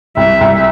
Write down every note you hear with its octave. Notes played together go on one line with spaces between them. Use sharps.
C2 E5
C2